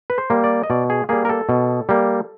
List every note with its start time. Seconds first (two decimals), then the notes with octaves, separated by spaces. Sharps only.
0.10 B4
0.18 C5
0.30 G3 A#3
0.44 D5
0.63 D#5
0.70 B2 D5
0.90 G#4
1.09 G3 A#3 G#4
1.25 A#4
1.29 A4
1.49 B2
1.89 G3 A#3